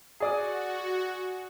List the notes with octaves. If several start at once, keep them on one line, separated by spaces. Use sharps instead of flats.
F#4 G#4 D5 D#6